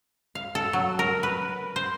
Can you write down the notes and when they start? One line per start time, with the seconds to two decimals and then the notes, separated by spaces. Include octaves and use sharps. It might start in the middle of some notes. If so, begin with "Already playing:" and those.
0.35 F5
0.55 A4
0.73 F#3
0.99 A#4
1.23 B4
1.76 C5